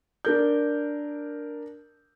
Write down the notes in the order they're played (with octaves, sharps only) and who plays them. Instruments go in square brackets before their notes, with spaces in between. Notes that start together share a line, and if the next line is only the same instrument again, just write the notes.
[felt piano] D4 A#4 G6